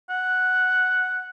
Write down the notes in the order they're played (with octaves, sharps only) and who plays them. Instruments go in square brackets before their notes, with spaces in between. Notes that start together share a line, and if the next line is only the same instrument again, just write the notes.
[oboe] F#5